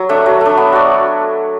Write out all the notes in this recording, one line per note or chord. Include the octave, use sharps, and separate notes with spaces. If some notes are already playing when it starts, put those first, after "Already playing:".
Already playing: F#3
A3 D4
F#3
A3 D4
B3
F#4 D5